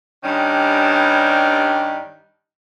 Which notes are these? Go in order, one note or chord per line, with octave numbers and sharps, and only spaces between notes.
G2 D#3 G3 C#4 D4